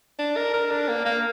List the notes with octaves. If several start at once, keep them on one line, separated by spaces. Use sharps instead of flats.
D4
A#4
A#4
D4
A#3
A#3